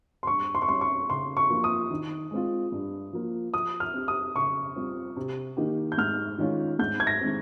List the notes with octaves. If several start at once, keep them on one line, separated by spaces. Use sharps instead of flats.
C6
G2 C#6
C6
C#6
G3 C#4 C6
C#6
C#3 C6
C#6
F3 A#3 F4
D#6
D#3
G#3 C4 F4
G2
F3 A#3 F4
F3 D#6
F6
C4 G4
D#6
C#3 C#6
G3 C4 F4
C3
D#3 A#3 D#4 G4
G6
G#2 F6
D#3 G#3 C#4 F4
G#2 G6
G#6
A#6
D#3 G#3 C4